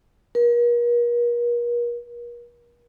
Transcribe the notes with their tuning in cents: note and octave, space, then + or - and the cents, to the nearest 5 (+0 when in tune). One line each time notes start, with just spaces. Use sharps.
A#4 +40